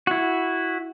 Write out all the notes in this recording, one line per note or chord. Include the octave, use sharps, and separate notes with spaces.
E4 F#4